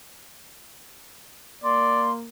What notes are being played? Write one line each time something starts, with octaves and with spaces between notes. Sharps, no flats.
A#3 D5 C6